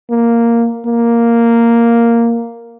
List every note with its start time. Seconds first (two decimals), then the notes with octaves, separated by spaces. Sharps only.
0.10 A#3
0.86 A#3